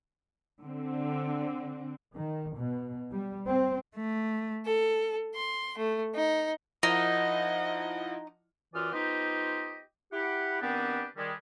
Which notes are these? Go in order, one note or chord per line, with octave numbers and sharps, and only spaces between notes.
D3 C4
D#3
B2
G3
C4
A3
A4
C6
A3
D#4
F3 D#4 E4 A#4 D#5 F#5
F#2 E3 F4 D5 D#6 F6
B3 D#4 F4 G4 C5 D#5
E4 G4 F#5
D#3 B3 C4 D4 G4 B4
D#3 G3 G#3